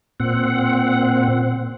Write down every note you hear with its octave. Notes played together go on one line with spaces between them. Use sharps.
A#2 C4 F#5